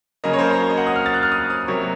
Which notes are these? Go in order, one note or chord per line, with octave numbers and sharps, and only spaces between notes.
C#3 F#3 A#3 D#5
C#5
C5
A#4
C5
D#5
F#5
D#6
F6
A6
F#6
F6
D#6
D#6
C3 F#3 A#3 C#6